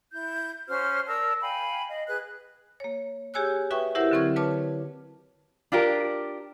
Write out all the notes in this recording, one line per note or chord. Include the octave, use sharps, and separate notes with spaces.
E4 G6
C#4 F#4 C5 F6
A#4 D5 A5 E6
F5 G5 G#5 B5
D#5 F5
G#4 B4 F#6
A#3 C#5
G4 G#4 C#5 G#5 E6 F#6
F#4 B4 E5 G5 C#6 D#6
E4 G4 A#4 C5 E5 F#5
D3 F#3 C4 C#6 F6 G#6
B4 C#5 A5 D6 F6
D4 F4 G4 A#4